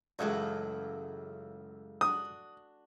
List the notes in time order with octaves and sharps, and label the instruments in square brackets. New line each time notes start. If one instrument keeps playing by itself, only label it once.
[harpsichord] C#2 F#2 [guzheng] E3 A3 F#4
[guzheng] D4 F#4 [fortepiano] D#6